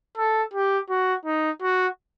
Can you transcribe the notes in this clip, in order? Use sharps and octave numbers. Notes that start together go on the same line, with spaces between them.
A4
G4
F#4
D#4
F#4